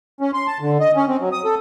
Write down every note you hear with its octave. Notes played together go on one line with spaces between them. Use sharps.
C#4
C6
A5
D3
D#5
C#4
C4
F#3
D#6
A4